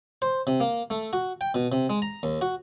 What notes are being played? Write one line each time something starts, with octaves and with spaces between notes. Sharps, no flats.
C5
C3
A#3
A3
F#4
G5
B2
C3
G#3
A#5
D#2
F#4